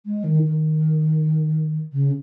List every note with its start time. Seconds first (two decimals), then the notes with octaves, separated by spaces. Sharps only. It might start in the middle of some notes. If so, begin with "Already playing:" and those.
0.06 G#3
0.24 D#3
0.43 D#3
1.93 C#3